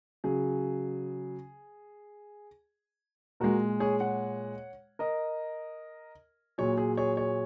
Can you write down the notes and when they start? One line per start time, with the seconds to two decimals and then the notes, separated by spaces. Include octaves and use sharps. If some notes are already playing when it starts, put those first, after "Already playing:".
0.24 C#3 F#3 G#4
3.40 A#2 G#3 F#4 A#4
3.80 G#4 C#5
4.00 C#5 F#5
4.99 A#4 D#5
6.58 A#2 F#3 G#4 C#5
6.78 G#4
6.97 G#4 C#5
7.17 G#4 C#5